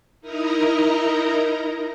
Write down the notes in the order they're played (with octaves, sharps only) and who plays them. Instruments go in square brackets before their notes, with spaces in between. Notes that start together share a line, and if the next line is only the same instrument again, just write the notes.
[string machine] D#4 E4 A#4 D#5 A#5